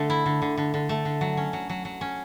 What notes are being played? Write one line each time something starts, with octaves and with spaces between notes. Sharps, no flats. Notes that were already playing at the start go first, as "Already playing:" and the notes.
Already playing: D3 A3
E4
D3
D3
D3
D3
A3
D3
F#3
C#4
F#3
F#3
F#3
C#4